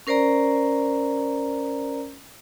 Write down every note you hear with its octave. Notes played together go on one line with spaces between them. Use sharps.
C#4 A#4 C5 D5 A#5